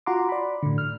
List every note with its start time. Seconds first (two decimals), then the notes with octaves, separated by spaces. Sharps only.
0.06 F4 F#4 F#5 A#5 C6 D6
0.29 D5 B5
0.63 A2 D3
0.78 F6